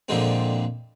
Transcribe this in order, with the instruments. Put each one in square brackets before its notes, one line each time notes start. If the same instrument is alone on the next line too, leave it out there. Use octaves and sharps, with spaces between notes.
[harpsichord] F2 A#2 D3 G#3 C4